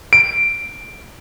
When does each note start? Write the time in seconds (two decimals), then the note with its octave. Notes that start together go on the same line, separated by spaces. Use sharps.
0.13 D7